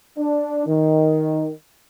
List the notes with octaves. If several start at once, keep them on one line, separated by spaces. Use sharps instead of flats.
D4
D#3